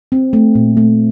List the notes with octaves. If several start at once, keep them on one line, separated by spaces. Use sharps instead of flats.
C4
A3
A#2
A3